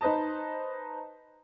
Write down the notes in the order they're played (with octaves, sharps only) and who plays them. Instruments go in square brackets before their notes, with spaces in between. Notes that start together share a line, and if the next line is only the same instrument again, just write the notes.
[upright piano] D#4 B4 C5 D#5 A5